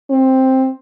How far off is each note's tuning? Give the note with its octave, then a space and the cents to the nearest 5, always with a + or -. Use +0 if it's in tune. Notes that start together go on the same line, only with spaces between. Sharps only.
C4 +5